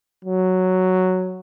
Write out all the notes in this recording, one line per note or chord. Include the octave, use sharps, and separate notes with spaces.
F#3